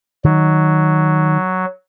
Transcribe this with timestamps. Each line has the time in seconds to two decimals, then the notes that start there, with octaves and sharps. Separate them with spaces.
0.25 D#3 F#3